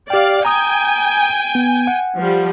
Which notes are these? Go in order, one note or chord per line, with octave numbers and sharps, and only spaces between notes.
G4 D5 F5 G5
G5 G#5 A#5 D#6
B3
F#5
F3 G3